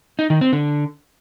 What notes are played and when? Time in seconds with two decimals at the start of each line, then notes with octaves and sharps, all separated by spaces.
0.19 D#4
0.30 D#3
0.41 C4
0.53 D3